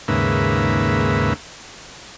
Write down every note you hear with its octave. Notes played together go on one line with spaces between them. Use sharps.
D#2 G#2 C#3 A#3 B4 E5